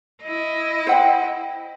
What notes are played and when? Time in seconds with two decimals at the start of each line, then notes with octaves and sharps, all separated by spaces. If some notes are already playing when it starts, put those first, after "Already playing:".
0.23 E4 D#5
0.87 C5 F#5 G5